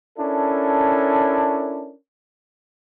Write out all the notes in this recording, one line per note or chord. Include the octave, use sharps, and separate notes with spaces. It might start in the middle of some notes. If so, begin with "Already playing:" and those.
C#4 D4 E4 A4 A#4